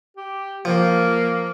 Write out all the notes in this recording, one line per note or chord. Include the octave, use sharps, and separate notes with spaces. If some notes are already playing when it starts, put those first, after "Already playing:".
G4
F3 A#3